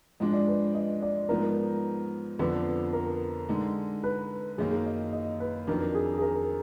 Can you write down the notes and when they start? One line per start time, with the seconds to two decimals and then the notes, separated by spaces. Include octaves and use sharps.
0.20 G#2 F3 G#3 D4 D#5
0.33 D5
0.47 B4
0.74 D#5
1.02 D5
1.29 G#2 F3 B3 D#4 A#4
2.39 F2 D3 F3 B3 D4 B4
2.93 A#4
3.49 D3 G#3 D#4
4.04 B4
4.58 F#2 D#3 A#3 D#4 G#4
4.71 G#4
4.86 D#5
5.13 D#5
5.40 B4
5.67 F2 D#3 F#3 D4 A#4
5.95 G#4
6.18 G#4
6.22 A#4